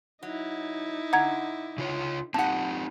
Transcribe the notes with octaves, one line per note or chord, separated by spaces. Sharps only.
F#3 D#4 E4
D3 F#5 A#5 G#6
C#3 F4 C#5
A#2 C4 D#4 G4 F#5 A5